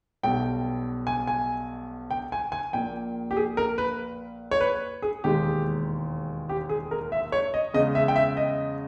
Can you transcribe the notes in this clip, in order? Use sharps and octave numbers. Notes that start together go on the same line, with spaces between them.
B1 B2 G3 G5
G#5
G#5
G5
G#5
G#5
A#1 A#2 A#3 G5
G4
G#4
A#4
B4
C#5
B4
G#4
E1 D#2 D#3 G#3 G4
G4
G#4
A#4
E5
C#5
D#5
E2 C#3 G#3 D#5
E5
G5
E5
D#5